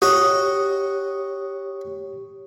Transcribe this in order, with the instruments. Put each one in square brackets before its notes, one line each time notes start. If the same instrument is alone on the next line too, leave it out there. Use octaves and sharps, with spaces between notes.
[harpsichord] F#4 D#5 [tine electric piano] G4 C#5